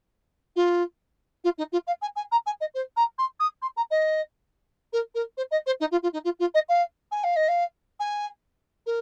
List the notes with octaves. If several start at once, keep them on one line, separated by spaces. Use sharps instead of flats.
F4
F4
D#4
F4
F5
G#5
G#5
A#5
G#5
D#5
C5
A#5
C6
D#6
C6
A#5
D#5
A#4
A#4
C5
D#5
C5
D#4
F4
F4
D#4
F4
F4
D#5
F5
G#5
F5
D#5
F5
G#5
A#4